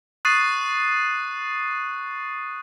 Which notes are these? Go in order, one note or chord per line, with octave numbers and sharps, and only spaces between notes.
C#6 D#6 F#6 A6 C7 D#7